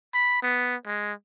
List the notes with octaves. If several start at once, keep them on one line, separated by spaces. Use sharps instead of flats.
B5
B3
G#3